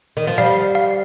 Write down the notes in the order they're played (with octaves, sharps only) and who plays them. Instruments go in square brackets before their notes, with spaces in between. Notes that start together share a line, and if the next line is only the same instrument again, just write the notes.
[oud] D#3
F3
[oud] G3 [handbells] F5
[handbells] F5